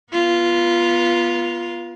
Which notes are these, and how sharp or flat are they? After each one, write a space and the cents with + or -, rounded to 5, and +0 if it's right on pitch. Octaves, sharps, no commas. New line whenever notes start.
B3 -15 F4 -10 A#4 +45